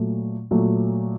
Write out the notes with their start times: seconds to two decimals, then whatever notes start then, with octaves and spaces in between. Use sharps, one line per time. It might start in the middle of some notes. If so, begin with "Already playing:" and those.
Already playing: A#2 F#3 A3
0.51 A#2 F#3 A3